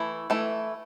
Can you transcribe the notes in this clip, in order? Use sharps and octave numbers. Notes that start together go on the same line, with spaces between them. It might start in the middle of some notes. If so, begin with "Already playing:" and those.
Already playing: E3 A3 E4
E3 A3 E4